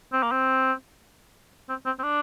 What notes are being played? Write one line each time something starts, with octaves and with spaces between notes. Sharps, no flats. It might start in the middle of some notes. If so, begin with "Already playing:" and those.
C4
A#3
C4
C4
C4
C4
D4